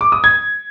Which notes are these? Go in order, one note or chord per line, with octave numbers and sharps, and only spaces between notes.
D6
D#6
G#6